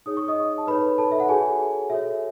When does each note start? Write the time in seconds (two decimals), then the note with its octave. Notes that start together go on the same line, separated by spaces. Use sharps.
0.06 D#4 G#4 C#5 D#6
0.17 C#6
0.28 D#5 D#6
0.58 A5
0.67 D#4 A4 B4 C#5 B5
0.98 A4 A5
1.12 E5
1.20 F#5
1.29 F#4 G#4 A4 C#5 G#5
1.90 F#4 A4 C#5 E5